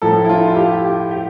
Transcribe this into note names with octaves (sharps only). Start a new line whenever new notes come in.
A2 F3 A4
E4
F4
F4
G4
G4
G4